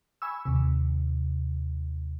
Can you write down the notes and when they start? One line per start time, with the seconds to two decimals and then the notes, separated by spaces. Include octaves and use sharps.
0.22 G#5 B5 C#6 E6
0.45 D#2 C3